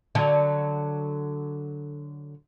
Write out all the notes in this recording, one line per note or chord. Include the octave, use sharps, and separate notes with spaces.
D3 F#3